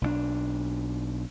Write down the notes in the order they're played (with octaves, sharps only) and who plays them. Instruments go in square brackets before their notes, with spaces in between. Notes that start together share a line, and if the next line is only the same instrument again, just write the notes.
[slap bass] B1 F3 D4